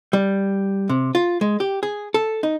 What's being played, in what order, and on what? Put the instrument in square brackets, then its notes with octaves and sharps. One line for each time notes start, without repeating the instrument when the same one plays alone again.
[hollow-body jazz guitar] G3
C3
F4
G#3
G4
G#4
A4
D#4